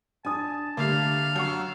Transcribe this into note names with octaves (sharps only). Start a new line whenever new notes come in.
D4 G#5 A5 D#6
D3 G3 A3 A#3 F5
F#2 F#5 C#6